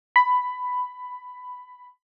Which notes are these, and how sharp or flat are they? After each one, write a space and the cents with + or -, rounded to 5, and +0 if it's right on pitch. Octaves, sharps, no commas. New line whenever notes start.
B5 +10